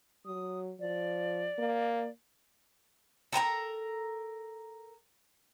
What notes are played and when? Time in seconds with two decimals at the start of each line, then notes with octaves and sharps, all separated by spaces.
0.26 F#3 D#6
0.80 F3 D5
1.59 A#3
3.32 A4 A#4 G5 A#5